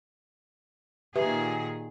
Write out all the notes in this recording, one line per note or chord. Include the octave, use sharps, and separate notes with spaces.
A#2 D#3 G4 G#4 B4 E5